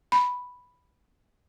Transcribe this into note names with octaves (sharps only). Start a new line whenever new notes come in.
B5